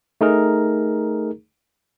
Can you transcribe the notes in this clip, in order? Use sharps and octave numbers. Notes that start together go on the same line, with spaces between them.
A3 D#4 G#4 A#4